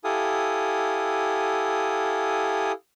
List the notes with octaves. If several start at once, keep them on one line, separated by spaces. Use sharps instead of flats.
E4 G4 A4 F5 G#5 D#6